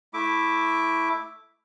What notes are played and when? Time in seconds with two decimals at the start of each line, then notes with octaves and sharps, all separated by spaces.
0.14 A3 E4 E5 D6